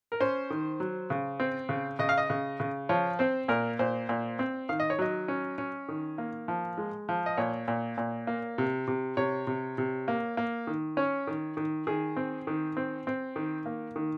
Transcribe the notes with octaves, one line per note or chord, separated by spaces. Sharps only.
A#4
C#4 C5
D#3
F#3
C#3
C4
C#3
C#3 D#5
F5
D#5
C#3
C#3
F3 C#5
C4 C5
A#2 A#4
A#2 C5
A#2
C4
D#3 F5
D#5
C#5
F#3 D#5
C#4
C#4
D#3
A#3
F3
G#3
F3
D#5
A#2 C#5
A#2
A#2
A#3
C3
C3
C3 C#5
C3
C3
A#3
A#3
D#3
C#4 C#5
D#3
D#3
D#3 G#4
C4
D#3
C4
C4
D#3
A#3
D#3